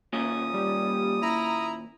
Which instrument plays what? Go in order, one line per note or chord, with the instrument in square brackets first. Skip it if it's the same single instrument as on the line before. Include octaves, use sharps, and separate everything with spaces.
[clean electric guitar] D#2 A#2 C#4 [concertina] D#6
[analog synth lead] G3
[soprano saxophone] E4 [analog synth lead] A#5